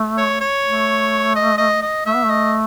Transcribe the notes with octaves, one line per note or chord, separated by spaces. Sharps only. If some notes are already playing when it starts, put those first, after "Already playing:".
Already playing: A3
C#5
C#5
A3
D#5
D#5
D#5
A3 E5
B3
A3 D#5